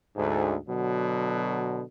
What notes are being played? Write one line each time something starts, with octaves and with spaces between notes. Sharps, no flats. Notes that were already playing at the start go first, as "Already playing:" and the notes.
D2 G#2
B2 D3 F#3